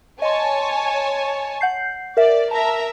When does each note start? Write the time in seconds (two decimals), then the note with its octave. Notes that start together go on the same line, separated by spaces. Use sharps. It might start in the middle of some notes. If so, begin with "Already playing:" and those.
0.22 C#5 D#5 G#5 A5 C6
1.61 F#5 G6 C7
2.17 A#4 D5 E5
2.51 A#4 E5 A5 A#5